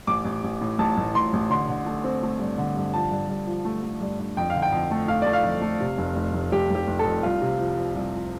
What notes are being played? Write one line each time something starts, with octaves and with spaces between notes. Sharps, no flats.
A1 D6
A1
A1
A2
A1 A5
A1
A2 C6
A1
D3 C6
D3
A3
C4
A3
G2
D3
G2
F3 A5
G2
G2
F3
A3
A3
G2
D4
F2 G5
F5
D3
G5
F2
A3
A3 F5
A3 D5
F5
F2
A3
C3
F1
F1
F1
F1 G4
F1 G4
F1
A4
F2
C2 F4
C3
F3
F3
C2
F3